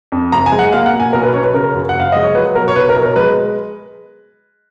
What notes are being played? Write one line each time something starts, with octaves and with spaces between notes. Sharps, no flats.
F2
F#1 A#5
G#5
G#3
F#5
A#3 F5
F#5
B2
G#5
B1 A#4
B4
C#4 C#5
B4
C#3 A#4
F#2
F#5
F#1 F5
G#3 D#5
C#5
F#3 B4
B2 A#4
C#5
B1 B4
A#4
B1
A#4
G#3 B4